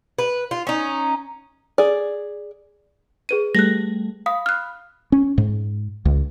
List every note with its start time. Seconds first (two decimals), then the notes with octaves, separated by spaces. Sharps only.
0.19 B4
0.51 F4
0.67 C#4 D#4
1.78 G#4 D5
3.29 G#4 B4 D#7
3.55 G3 A3 F#6 A#6
4.26 F5 B5 D#6
4.46 F6 F#6
5.12 C#4
5.38 G#2
6.05 C#2